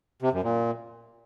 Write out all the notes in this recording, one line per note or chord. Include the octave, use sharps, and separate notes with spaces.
C3
F#2
A#2